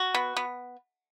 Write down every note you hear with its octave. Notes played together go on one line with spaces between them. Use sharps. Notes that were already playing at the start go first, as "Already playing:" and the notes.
Already playing: F#4
B3
B3